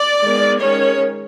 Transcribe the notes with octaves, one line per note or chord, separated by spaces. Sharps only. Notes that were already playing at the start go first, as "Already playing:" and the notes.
Already playing: D5
D#3 G#3 B3
D#3 G#3 C#4 C#5